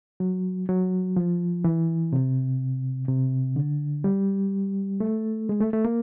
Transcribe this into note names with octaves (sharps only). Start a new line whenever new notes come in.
F#3
F#3
F3
E3
C3
C3
D3
G3
A3
G#3
A3
A3
A#3